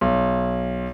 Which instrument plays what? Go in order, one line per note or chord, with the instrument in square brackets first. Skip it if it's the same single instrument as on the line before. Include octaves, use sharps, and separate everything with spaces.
[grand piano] B1